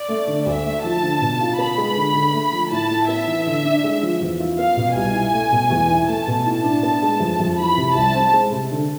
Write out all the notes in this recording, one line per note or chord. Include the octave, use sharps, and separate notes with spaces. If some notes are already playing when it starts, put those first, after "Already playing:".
Already playing: D5
A3
D3
D2 E5
A3
F3 A5
D3
B2
F4
B3 B5
G#3
D3
D3
A3
F3
A2 A5
A2
B3 E5
E3
D3
D4
G#3
F3
E2
F4
B3 F5
B2
C2 G#5
E4
A3
B2
E2
E4
A3 A5
B2
A2 A5
D4
B3
G#3
F2
F2
E3 B5
C3
C2 A5
C4
G#3
C3
D3